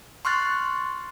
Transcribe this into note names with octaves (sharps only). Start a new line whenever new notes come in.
C6 C#6 F6 F#6 A6